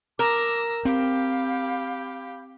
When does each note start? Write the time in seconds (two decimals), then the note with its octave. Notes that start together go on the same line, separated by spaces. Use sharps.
0.19 A#4 A5 D6 E6 A#6
0.85 C4 G4 F5 B5 G6